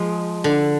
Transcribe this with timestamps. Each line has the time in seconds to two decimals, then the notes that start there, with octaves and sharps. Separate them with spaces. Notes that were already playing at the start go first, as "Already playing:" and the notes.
Already playing: F3 G#3
0.44 D3